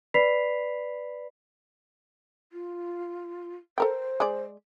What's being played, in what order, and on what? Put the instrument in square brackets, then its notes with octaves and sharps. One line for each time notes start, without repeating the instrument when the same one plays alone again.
[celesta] B4 D5 B5 B6 C7 F7
[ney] F4
[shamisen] A4 A#4 G5 [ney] C5
[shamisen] G#3 D5